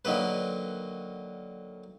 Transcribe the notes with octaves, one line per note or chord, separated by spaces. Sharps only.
D3 D#3 F#3 A#3 B4